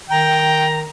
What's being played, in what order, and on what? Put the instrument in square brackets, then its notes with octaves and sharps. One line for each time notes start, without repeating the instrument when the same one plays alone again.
[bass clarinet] D#3 [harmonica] G5 [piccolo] A#5